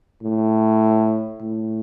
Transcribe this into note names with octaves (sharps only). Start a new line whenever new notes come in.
A2
A2